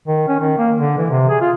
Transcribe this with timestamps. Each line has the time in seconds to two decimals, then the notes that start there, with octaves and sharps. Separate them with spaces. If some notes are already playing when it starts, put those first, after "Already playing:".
0.08 D#3
0.28 C#4
0.40 D#3
0.59 A#3
0.79 D3
0.98 E3
1.10 C3
1.29 G#4
1.41 F4